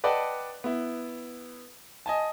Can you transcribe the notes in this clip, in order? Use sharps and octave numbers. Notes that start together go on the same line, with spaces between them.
B4 D5 D#5 F#5 G5 A5
B3 E4
D#5 G#5 A5